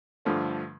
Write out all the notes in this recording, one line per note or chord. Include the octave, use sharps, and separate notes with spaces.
G2 D3 F3 A3